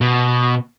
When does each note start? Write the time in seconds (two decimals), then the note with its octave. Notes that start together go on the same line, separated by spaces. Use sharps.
0.01 B2